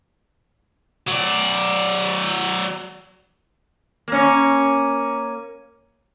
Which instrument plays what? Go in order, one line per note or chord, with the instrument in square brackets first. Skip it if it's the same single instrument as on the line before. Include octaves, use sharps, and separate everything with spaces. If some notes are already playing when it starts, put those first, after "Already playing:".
[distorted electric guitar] F#3 D5
[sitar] A#3 C#4